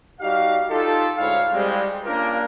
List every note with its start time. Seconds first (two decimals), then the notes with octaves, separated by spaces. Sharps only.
0.20 G3 D#4 F#4 G4 F5
0.69 D#4 F4 G4 A4
1.18 D2 G#2 G#3 E4 C#5 F5
1.52 G3 G#3 C4
2.05 A#3 C#4 D4 F4 G4 A#4